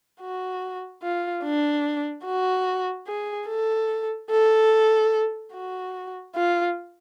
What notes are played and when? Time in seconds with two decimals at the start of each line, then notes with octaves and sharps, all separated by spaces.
0.21 F#4
1.03 F4
1.44 D4
2.25 F#4
3.07 G#4
3.48 A4
4.31 A4
5.53 F#4
6.35 F4